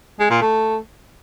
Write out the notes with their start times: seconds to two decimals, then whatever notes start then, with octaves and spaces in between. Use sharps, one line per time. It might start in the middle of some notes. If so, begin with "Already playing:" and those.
0.20 G#3
0.30 A#2
0.41 A3